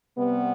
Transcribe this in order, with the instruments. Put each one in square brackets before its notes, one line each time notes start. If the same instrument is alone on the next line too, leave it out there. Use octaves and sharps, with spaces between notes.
[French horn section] C3 G3 B3